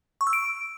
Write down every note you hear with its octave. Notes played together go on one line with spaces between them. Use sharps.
C#6
E6
D7